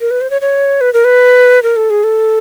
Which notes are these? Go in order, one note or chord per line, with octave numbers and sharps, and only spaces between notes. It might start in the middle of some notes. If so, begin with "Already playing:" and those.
A#4
B4
C5
C#5
C#5
B4
A#4
B4
A#4
A4
G#4
A4